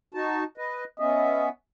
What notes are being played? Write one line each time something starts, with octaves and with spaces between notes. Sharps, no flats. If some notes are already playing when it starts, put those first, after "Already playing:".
D#4 F#4 A5
B4 D#5
B3 C#4 D#5 E5